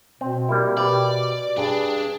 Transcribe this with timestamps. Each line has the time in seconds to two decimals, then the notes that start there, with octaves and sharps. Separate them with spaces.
0.21 B2 C4
0.49 G3 A#3 E4
0.77 B2 G4 B4 D5
1.57 G2 D4 G#4